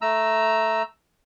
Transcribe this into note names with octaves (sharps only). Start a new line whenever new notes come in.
A3 A#5 E6